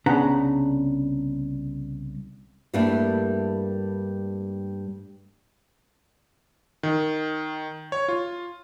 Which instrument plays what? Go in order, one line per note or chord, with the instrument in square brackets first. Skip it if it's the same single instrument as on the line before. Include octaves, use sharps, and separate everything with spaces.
[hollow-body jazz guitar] C2 C#3 B3 D4 F#5 A#5
[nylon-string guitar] G2 G3 A3 A#3 D4 E4
[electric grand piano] D#3
C#5
F4